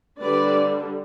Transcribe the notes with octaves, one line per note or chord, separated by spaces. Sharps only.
D3 G3 D4 B4 D5